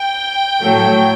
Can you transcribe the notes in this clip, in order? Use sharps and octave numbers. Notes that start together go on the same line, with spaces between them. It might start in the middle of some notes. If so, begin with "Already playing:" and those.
Already playing: G5
A2 F#3 A3